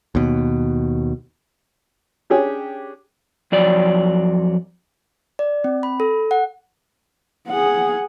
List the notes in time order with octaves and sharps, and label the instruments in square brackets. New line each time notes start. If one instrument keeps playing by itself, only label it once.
[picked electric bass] D#2 B2
[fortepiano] C#4 D4 G4 G#4 C#5
[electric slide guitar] F2 F#3 D5
[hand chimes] D5
C4
B5
A4
F#5
[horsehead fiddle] G#4 F#5